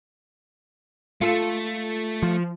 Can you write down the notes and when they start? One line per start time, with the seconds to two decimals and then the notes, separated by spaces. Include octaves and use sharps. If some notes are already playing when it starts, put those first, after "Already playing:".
1.21 A3 F4 A4
2.23 F3